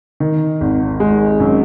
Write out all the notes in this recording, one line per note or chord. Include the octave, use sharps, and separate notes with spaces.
D#3
G#1
G#3
F#2